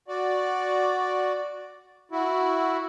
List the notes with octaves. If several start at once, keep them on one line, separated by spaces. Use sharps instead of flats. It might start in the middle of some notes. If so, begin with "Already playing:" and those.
F#4 D5
E4 F#4